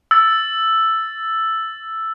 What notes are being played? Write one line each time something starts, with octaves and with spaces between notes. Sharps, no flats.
E6 A6